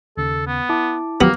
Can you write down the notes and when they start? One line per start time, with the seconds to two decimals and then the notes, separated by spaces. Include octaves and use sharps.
0.17 D#2 C#3 A4
0.47 B3
0.69 E4 A5 D6
1.21 F3 F#3 A#3 B3 G4